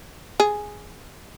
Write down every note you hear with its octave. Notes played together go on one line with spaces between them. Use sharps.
G#4